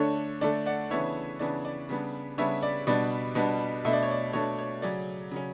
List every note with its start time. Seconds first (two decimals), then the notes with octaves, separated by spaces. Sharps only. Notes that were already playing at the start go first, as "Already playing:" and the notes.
Already playing: D3 A3 D4 C#5
0.41 D3 A3 D4 D5
0.66 D5 F#5
0.90 C#3 E3 B3 D4 C#5 E5
1.39 C#3 E3 B3 D4 D5
1.65 D5
1.89 C#3 G3 B3 D4
2.38 C#3 G3 B3 D4 C#5 E5
2.63 D5
2.87 B2 G3 B3 D4 D5
3.35 B2 G3 B3 D4
3.85 B2 A3 D4 E5
3.93 D5
4.03 C#5
4.11 D5
4.33 B2 A3 D4 C#5
4.59 C#5
4.82 C#3 F#3 C#4 D5
5.31 C#3 F#3 C#4